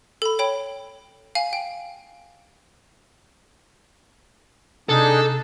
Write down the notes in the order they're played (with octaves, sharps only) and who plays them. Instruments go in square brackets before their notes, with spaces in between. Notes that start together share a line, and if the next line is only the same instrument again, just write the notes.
[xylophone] A4 B5
C#5 G5 B5
F5 G#5
G5
[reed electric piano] C3 [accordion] D4 D#4 G#4 [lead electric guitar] A4